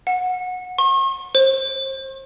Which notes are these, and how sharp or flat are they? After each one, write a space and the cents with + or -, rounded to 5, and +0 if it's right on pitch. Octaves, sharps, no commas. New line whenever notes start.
F#5 -20
C#6 -45
C5 +30